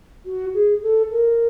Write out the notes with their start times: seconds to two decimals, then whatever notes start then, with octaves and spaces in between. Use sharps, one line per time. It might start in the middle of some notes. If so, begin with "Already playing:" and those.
0.25 F#4
0.54 G#4
0.82 A4
1.11 A#4